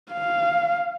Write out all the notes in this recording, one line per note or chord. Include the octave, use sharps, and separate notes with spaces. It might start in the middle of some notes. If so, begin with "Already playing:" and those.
F5